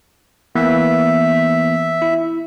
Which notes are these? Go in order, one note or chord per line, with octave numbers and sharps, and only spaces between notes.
E3 A#3 B3 E5
E4